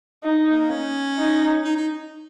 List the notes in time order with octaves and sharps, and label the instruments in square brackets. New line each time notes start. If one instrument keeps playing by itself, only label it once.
[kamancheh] D#4
[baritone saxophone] A#3
C#4
[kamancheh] D#4
[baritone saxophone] D#4
D#4